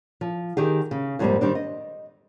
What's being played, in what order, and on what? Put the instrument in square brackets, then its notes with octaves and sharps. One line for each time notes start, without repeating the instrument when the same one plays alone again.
[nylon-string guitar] F3
D#3 G4 G#4
C#3
F2 G#2 F3 G3 A#3 C4
D#3 G3 C4 D4
D#5